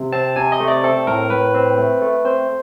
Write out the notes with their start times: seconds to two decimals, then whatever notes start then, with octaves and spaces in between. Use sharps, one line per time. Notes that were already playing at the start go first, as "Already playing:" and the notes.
Already playing: C3
0.12 C4 A5
0.36 C3 G#5
0.52 D#5
0.60 A3
0.68 D5
0.83 C4 A4
1.07 A2 A#4
1.30 A2 B4
1.54 C4
1.78 A3
2.02 A3
2.25 C4 C5